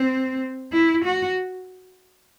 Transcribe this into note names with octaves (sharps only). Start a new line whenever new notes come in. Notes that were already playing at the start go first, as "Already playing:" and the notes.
Already playing: C4
E4
F#4